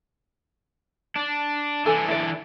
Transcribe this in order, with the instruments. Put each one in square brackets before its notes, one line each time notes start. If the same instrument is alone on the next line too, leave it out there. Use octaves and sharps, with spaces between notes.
[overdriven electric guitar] D4
[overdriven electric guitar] E3 D4 [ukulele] A4 G#5
[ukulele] E4 D5